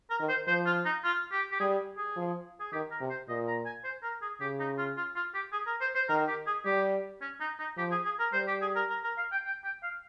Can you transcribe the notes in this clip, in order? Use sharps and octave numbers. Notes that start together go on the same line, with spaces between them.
A#4
D#3
C5
F3 C5
F4
D#4
F4
G4
G4
G3 G#4
G#4
F3
G#4
D#3 G4
A#4
C3
C5
A#2 D#5
A#5
G#5
C5
A#4
G#4
C#3 G4
D#4
F4
F4
F4
G4
G#4
A#4
C5
C5
D#3 A#4
G4
G#4
G3 G4
C#4
D#4
D#4
F3 G4
G#4
G#4
A#4
G3 C5
G4
G#4
A#4
A#4
A#4
F5
G5
G5
G5
F5